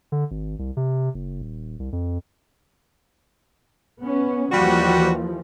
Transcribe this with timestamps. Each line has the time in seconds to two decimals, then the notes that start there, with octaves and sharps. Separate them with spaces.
0.12 D3
0.31 G#1
0.59 C2
0.77 C3
1.14 F#1
1.42 D#1
1.79 C2
1.92 F2
4.00 B3 C#4
4.52 D#2 E3 F3 G3 F#4